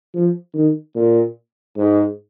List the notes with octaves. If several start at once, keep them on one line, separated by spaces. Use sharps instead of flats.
F3
D#3
A#2
G#2